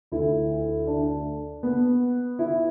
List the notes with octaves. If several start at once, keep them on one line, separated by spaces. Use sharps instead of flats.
D2 D3 E4
D4
B3
E4